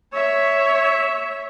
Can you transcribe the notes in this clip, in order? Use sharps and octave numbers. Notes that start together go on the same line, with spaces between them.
C#5 E5